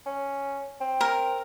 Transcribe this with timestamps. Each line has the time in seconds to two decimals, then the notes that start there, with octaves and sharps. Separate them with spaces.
0.06 C#4
0.81 C4
1.01 A#4